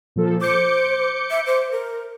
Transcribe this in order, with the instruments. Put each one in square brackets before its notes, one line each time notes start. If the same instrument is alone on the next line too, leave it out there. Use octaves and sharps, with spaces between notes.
[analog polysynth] A#2 F3 A4
[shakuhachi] C5 [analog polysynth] D6 G6 C#7
[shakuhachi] E5
C5
A#4